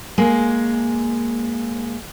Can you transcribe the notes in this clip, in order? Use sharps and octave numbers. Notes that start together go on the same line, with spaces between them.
G#3 A#3